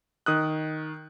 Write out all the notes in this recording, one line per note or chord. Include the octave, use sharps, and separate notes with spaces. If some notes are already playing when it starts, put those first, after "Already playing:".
D#3 D#6 F#6